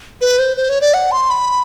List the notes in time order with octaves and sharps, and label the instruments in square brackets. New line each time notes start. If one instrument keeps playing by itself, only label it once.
[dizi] B4
C5
C5
C#5
D5
F#5
C6
B5